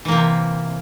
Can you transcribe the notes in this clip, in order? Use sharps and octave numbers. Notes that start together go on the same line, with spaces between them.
C3 E3 A#3